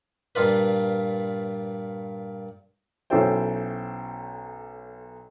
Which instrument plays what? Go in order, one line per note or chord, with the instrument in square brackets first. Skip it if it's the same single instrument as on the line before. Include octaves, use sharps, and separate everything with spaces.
[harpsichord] G2 A#2 F4 B4
[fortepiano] B1 C#4 E4 A4 C5 G5